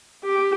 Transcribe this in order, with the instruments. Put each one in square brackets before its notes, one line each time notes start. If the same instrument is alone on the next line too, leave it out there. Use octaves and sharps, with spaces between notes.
[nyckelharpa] G4